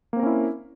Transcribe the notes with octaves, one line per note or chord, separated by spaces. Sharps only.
A#3 C4 C#4 E4 A#4